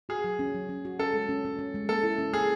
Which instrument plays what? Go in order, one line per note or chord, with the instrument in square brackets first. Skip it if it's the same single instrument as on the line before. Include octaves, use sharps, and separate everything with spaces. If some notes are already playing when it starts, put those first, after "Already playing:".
[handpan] F#4 [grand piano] G#4
[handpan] F#3
C#4
F#3
C#4
F#4
[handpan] C#4 [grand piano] A4
[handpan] G#3
C#4
C#4
C#4
G#3
[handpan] A#3 [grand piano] A4
[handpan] E4
C#4
[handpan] A#3 [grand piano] G#4